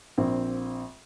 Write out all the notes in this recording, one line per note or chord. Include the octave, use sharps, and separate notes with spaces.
A#1 C4